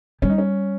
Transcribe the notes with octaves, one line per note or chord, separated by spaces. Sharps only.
G3 C#4
D#4
C#4